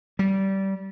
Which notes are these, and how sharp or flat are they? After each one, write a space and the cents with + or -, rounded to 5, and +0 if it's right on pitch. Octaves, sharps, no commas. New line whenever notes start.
G3 -20